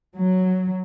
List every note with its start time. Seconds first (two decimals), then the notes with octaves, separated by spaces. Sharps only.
0.16 F#3